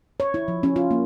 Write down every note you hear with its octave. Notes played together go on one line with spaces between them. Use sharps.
C#5
E4
F3
C#4
F4
A#3